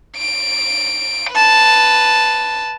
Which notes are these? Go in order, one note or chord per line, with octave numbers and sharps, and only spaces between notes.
D7
B4 A5